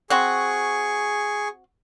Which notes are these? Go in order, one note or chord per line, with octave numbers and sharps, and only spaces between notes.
C4 F#4 G#4 C#6